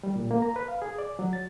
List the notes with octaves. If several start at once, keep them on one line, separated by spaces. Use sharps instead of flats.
G3
A#2
A#3
A#5
B4
F5
G#4
D5
F#3
A6